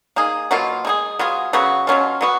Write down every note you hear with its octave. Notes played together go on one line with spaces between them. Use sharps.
A#3 D#4 G#4
B2 F#3 A#3 F4
G#3 D#4 G#4
F#3 B3 F4 G#4
C#3 F#3 B3 F#4
B2 F#3 C#4 F4
F#3 B3 F#4